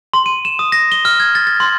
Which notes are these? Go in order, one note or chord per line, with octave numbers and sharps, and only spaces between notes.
C6
D#7
E7
D#6
A#6
G7
F6
G#6
A6
A6
C6